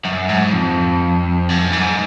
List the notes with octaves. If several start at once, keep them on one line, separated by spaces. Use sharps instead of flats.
F#2
G#2
F2
F#2
G#2